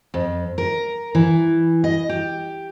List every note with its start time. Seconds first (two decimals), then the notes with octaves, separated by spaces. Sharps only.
0.14 F2
0.58 A#4
1.15 E3
1.84 D#5
2.09 G4